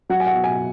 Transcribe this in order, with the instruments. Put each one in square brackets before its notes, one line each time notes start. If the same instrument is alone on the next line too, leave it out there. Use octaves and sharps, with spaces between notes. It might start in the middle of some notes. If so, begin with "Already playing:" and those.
[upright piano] F#3 F#5
G#5
F#5
B2
G#5